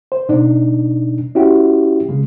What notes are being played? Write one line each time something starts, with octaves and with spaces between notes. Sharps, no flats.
C5
B2 D4 D#4
C#4 E4 F#4 G4
C#3 G#3